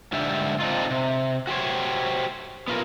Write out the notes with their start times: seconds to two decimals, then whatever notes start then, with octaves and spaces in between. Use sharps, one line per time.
0.13 G#2 D3 D4 G4 E5
0.60 C4 D4 D#4 F4
0.90 C3
1.47 F#4 G4 C5 C#5
2.68 B3 F4 A#4